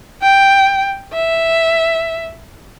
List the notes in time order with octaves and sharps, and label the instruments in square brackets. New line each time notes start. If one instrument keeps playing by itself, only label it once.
[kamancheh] G5
E5